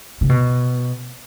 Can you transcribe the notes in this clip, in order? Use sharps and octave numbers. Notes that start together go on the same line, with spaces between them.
C#3
B2